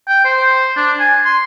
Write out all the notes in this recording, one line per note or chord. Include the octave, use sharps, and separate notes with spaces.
G5
C5
D4
G#5
C6